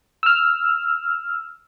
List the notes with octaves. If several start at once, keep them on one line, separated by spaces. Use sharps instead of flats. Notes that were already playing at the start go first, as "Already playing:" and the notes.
E6 F6